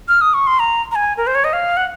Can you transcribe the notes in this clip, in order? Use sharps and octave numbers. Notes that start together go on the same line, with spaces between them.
F6
D#6
C#6
C6
A#5
A#5
G#5
A#4
C5
C#5
D#5
F5
F#5